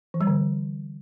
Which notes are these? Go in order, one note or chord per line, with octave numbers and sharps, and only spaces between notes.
E3
G3
D3